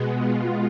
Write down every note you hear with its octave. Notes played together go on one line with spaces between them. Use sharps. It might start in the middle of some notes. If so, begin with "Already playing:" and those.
Already playing: B2 G#3 B3
F4